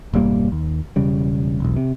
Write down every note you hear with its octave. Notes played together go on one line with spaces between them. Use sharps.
E1 G2 G3 A#3
D#2
E1 C#3 G3
E1 B1
C3